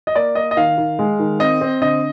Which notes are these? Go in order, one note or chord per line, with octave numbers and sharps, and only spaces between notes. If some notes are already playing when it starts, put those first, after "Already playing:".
D#5
A#3 D5
A#3 D#5
D#5
D#3 F5
D#3
G#3
D#3
C4 D#5
C4
D3 D#5